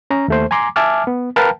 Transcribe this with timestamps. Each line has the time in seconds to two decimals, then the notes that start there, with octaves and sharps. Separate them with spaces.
0.10 C#4 A#5
0.28 D#2 A3 C5
0.51 G#5 A#5 C6 D6
0.76 E5 G#5 A5 D6 F6
1.07 B3
1.36 A#4 B4 F5 G5 A5 A#5